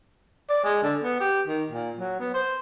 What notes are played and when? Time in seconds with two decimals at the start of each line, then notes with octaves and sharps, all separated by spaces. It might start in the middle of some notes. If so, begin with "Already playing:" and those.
0.50 D5
0.64 G#3
0.83 D3
1.03 B3
1.20 G4
1.47 D#3
1.71 A#2
1.99 F#3
2.20 B3
2.34 C5